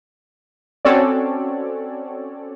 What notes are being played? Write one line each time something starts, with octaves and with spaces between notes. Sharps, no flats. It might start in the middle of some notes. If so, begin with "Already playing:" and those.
C4 C#4 F#4 A4 C#5 D5